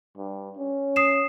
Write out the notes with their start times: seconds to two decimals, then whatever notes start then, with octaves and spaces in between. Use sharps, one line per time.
0.17 G2
0.58 C#4
0.96 D#6 C7 E7